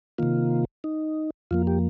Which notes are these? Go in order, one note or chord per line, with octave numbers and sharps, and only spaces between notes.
C3 D#3 A#3 F4
D#4
F2 F3 A#3 F4
G4